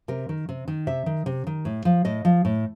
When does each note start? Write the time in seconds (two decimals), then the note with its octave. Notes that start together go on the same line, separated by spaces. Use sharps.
0.08 C3 A#4
0.29 D#3
0.49 C3
0.68 D#3
0.87 C3 E5
1.06 D#3
1.26 C3
1.47 D#3
1.65 A2
1.85 F3
2.05 A2 D#5
2.25 F3
2.45 A2